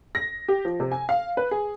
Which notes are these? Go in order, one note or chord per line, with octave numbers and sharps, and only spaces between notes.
A#6
G4
F3
C3
G#5
F5
B4
G#4